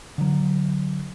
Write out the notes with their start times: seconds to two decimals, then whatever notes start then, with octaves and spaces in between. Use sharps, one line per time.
0.18 D3 F#3